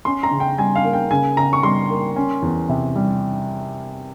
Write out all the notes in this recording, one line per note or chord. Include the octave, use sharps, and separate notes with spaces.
C#4 C6
A#5
C#3
G5
G3 G#5
F5
A#3
G5
C#3 G#5
C#3 A#5
C#6
G3 C6
A#3
C#4
E2
C3
G3